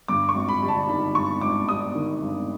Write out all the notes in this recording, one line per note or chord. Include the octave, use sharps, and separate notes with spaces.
G2 D6
C#6
G#1
B5
G3
A5
D#3 B5
G2 C#6
G#1 D6
G3 D#6
D#3
G2